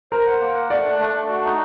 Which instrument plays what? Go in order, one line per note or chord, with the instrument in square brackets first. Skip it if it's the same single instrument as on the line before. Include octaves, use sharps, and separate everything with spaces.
[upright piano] A#4 [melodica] C5
[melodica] F#5
A#3
F#5
[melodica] A3 [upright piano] D5
[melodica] D4
A3
A3
F#4
D#4